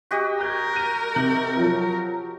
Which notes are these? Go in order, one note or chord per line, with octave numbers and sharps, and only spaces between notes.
F#4 G4 D#5
A#4 G6 G#6
F#6 D#7
C3 G6 F#7
F3 F#3